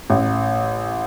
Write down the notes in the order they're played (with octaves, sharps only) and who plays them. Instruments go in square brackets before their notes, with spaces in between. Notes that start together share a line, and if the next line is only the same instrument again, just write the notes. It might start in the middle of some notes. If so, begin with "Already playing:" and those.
[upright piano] A1